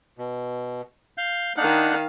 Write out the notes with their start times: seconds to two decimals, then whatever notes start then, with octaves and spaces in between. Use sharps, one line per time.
0.18 B2
1.18 F5 G6
1.57 D#3 D4 D#4 F5 F#5